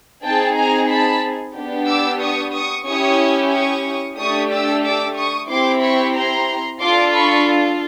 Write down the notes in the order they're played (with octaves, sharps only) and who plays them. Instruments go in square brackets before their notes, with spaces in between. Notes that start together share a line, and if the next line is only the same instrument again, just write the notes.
[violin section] C4 D#4 G#4 G5 A5
G#5 A#5
A5 B5
B3 D4 G4
D6 E6
C#6 D#6
C#6 D#6
C#4 E4 G4 C#6 D#6
C#6 D#6
A3 D4 G4 C#6 D#6
D6 E6
D6 E6
C#6 D#6
C4 E4 G4 C6 D6
B5 C#6
A#5 C6
D4 F4 A4 C6 D6
B5 C#6